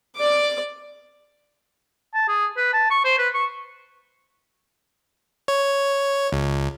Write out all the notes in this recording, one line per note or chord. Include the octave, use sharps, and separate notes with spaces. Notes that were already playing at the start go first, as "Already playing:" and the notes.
D5 D6
A5
G#4
B4
A5
C#6
C5
B4
C#6
C#5
C#2